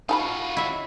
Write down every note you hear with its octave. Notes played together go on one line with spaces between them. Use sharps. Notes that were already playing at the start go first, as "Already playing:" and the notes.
D#4 F4 F#4 A5 B5
E4 E5